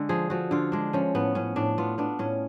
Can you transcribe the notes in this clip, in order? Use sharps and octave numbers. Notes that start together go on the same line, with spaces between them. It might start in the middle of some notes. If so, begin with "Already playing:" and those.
Already playing: D3 G#3
F3 G#4
F3 F#4
D3 F4
G#3 D4
F3 C#4
A2 B3
A2 C#4
A2 D4
B3 F4
B3 D4
A2 C#4